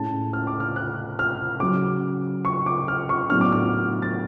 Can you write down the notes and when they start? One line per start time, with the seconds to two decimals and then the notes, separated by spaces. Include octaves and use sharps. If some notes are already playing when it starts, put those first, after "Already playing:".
Already playing: A2 G#3 C#4 A5
0.33 F6
0.47 D6
0.60 F6
0.76 F#6
1.19 F6
1.60 C#3 F#3 C#4 D6
2.45 C#6
2.66 D6
2.88 F6
3.09 C#6
3.29 A2 F#3 B3 D4 F6
3.41 D6
3.52 F6
4.02 A6